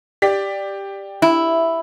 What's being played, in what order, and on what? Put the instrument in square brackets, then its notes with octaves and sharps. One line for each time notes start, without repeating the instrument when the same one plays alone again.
[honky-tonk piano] G4 D5 B6
[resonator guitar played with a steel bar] E4